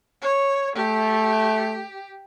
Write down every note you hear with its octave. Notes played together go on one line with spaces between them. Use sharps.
C#5
A3 G4